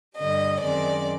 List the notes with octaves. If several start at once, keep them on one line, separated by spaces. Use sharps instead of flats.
G2 D3 G3 D#5
F#2 D#3 G#3 C4 D5